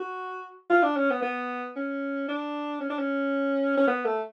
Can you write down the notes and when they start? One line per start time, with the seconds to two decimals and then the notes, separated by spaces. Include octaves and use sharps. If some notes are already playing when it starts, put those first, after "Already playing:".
Already playing: F#4
0.70 F4
0.83 D4
0.96 C#4
1.10 B3
1.22 B3
1.76 C#4
2.29 D4
2.81 C#4
2.90 D4
2.99 C#4
3.77 C#4
3.87 B3
4.05 A3